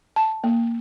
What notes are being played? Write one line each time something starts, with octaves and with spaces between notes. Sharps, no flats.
A5
A#3